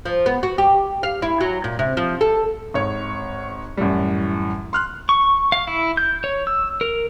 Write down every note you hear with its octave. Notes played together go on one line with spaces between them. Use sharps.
F3
B3
F#4
G4
F5
E4
F#3
A#2
C3
F3
A4
G#1 C#5
F#2 A2 E3 G3
C6 F6 F#6
C#6
F5
E4
G6
C#5
E6
A#4